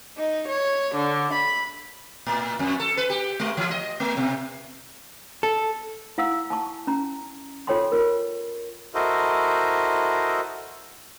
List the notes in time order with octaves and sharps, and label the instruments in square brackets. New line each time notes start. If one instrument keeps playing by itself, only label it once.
[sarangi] D#4
C#5
D3
B5
[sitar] A2
F2
A4
B4
G4
G#3
E3
D#5
A3
B2
[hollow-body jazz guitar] A4
[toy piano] E4 F5 F#5 E6
G#5 A5 C#6
C#4 A#5
F4 A4 C#5 G5 G#5 C6
F4 A#4
[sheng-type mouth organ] E4 F#4 A4 A#4 C5 D#5